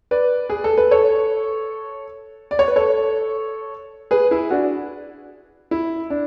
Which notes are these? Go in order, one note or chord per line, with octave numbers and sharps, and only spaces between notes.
B4 D5
G#4
A4
B4
A4 C#5
D5
C#5
B4
A4 C#5
G#4 B4
E4 G#4
D4 F#4
E4
D4